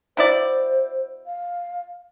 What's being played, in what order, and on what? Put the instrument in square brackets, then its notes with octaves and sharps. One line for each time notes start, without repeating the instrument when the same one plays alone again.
[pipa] B2 E4 D5 [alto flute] C5
[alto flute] F5